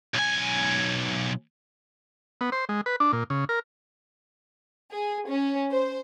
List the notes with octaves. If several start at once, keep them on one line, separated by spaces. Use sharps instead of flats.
B1 G#5
B3
C5
G#3
B4
D4
A#2
C#3
A#4
G#4
C#4
C5